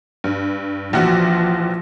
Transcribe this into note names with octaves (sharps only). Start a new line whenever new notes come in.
G2
A#1 E3 F3 F#4